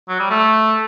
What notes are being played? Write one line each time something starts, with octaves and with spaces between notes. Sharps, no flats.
F#3
G3
A3